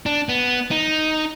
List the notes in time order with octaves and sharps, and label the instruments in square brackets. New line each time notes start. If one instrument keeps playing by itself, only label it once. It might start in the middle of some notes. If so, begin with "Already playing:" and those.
[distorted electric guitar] D4
B3
D#4